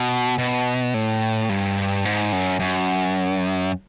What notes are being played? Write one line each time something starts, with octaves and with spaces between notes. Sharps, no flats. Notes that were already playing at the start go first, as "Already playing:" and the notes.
Already playing: B2
B2
A2
G2
G#2
F#2
F#2